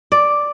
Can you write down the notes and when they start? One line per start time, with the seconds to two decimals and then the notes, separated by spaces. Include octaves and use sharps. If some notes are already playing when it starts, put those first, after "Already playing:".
0.12 D5